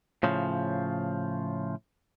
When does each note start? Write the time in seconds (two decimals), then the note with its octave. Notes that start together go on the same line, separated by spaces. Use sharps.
0.23 A2 C#3 F3